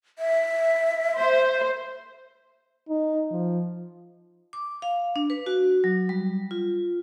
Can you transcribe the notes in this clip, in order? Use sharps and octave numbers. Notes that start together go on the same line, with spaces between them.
E5
C5
D#4
F3
D6
F5
D4
B4
F#4
F#3
G3
F4